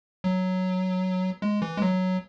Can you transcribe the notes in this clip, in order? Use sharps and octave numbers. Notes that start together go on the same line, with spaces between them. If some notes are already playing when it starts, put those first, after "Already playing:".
F#3
G#3
E3
G#3
F#3